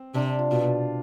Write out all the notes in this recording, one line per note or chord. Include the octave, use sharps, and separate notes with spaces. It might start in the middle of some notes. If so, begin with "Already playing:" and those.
Already playing: C4
C3 D4
F4
B2 F4